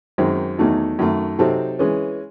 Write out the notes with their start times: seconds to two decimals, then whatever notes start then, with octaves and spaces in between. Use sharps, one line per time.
0.18 F#2 D#3 G#3 C4 D#4
0.59 E2 D#3 F#3 A3 D#4
0.99 F#2 D#3 A3
1.39 C3 F#3 C4 D#4 A4
1.79 E3 G#3 C#4 G#4